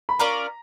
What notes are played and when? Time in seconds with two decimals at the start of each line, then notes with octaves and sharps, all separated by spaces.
0.09 B5
0.19 C#4 F4 A#4 D5 A#5